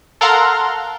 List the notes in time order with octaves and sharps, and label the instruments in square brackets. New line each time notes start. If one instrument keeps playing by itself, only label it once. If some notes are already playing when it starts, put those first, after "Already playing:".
[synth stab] A4 A#4 F5 F#5 A#5 C6